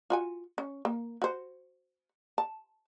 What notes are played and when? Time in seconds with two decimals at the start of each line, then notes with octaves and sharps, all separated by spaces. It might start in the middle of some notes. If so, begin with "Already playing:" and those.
0.10 F4 F#4 G#5
0.58 C#4
0.85 A#3
1.22 F#4 C5
2.38 A5